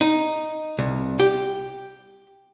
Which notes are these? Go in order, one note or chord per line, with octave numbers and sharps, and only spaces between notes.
D#4
C2
G4